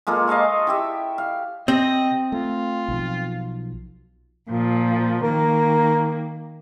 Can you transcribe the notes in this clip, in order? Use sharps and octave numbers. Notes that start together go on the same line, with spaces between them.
G#3 A#3 F4 A4
D#5 F5 A5 C#6
E4 G4 E5
F5
C3 C4 D#5
A3 F4
B1 F3
A#2 F3
D#3 A#3 A#4